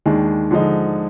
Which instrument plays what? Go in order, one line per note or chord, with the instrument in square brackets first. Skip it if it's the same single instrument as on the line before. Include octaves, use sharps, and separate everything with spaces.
[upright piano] D#2 D#3 G#3 D4
D3 F3 G#3 D#4